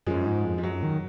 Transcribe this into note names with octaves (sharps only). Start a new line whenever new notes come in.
F#2 F3 G#3
G#2
F2
F3
F#2 F#3
D#3